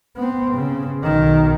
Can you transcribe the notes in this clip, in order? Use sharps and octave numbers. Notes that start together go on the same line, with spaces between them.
B3 C4
C#3
B1 D#3